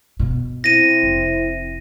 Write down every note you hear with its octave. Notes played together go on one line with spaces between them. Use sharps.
B2
C4 E4 A#6 D#7
F1